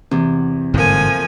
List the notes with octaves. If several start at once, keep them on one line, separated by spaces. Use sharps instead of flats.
E2 C3
G1 G#2 F3 A3 A#3 G#5